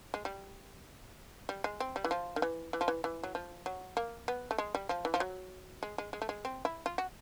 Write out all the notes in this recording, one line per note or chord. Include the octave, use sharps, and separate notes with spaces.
G#3
G3
G3
G#3
C4
G3
E3
F3
D#3
E3
E3
F3
E3
E3
F#3
F3
F#3
A#3
B3
A3
G#3
G3
F3
E3
F3
F#3
G#3
G#3
G#3
A3
G#3
C4
E4
F4
F#4